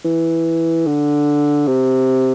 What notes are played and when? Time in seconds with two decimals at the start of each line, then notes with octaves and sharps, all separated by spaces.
0.05 E3
0.87 D3
1.68 C3